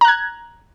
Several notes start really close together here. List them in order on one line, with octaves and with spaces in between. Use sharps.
A#5 F#6 G#6